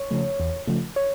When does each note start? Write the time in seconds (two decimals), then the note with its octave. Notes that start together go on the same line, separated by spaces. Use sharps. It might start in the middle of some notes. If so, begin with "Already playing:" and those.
Already playing: C#5
0.11 C#3 F3 A3
0.40 E2
0.67 C#3 F3 A3
0.96 C#5